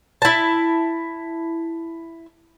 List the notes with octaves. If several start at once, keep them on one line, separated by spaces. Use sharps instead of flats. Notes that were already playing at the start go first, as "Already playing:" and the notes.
E4 A5